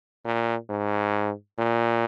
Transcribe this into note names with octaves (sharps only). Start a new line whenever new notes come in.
A#2
G#2
A#2